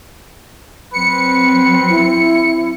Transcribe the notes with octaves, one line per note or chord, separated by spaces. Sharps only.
F#3 C4 B4 C#7
E4